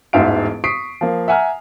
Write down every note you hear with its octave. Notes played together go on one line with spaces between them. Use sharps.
E1 A1 G#2 E5 F5 D7
C#6 D#6 B6 C7 D7
F3 A#3
E5 F#5 G#5 A#5 F6